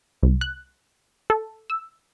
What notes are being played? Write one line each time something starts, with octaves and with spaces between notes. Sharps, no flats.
C2
F#6
A4
E6